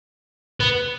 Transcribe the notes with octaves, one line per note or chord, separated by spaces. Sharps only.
B3